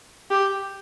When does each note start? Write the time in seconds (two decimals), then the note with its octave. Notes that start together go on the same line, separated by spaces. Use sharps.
0.30 G4